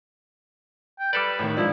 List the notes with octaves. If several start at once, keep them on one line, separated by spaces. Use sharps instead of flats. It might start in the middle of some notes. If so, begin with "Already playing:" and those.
G5
G3 A4 B4 D5
A1 D#3
G#2 F3 D4 E4